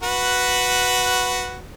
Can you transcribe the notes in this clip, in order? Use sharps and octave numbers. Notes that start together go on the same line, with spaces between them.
F#4 B4